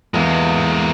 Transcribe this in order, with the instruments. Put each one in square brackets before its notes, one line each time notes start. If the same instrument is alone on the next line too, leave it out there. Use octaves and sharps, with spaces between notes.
[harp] E2 [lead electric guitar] G#3 A#3